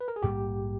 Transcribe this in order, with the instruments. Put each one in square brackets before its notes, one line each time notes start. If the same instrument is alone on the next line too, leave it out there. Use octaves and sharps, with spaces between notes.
[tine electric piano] B4
A#4
G#4
[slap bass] A#1 G#2 G3 A#3 [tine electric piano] G4